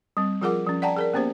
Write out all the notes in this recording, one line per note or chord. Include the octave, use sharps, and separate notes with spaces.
G3 C4
F3 F4 G#4 A#4 F#5 D6
F3 C#4
D5 F#5 G5 A5 A#5
G#4 A#4 D5
A#3 B3 C#4 G4 C5